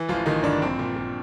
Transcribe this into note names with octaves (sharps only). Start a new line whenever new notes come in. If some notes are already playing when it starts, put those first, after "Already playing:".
Already playing: E3
A1 F3 F4
A1 D#3 D#4
G2 D3 D4
A#1 C4
A#2
A#2